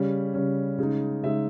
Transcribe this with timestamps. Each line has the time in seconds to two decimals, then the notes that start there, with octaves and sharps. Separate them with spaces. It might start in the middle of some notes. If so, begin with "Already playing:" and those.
Already playing: C#3 G3 C#4
0.34 C#3 G3 C#4
0.78 C#3 G#3 D#4
1.23 C#3 G#3 D#4 E5